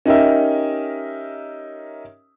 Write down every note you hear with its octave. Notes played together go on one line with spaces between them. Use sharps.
C#4 D#4 G4 A#4 E5